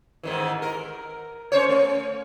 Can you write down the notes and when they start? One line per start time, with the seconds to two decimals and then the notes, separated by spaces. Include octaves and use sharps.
0.23 G#2 D#3 E3
0.62 A#4
1.52 C#4 C5 C#5
1.69 A3